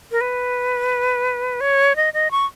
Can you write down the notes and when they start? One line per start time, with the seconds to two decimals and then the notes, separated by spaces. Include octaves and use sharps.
0.12 A#4
0.21 B4
1.61 C#5
1.96 D#5
2.14 D#5
2.31 C#6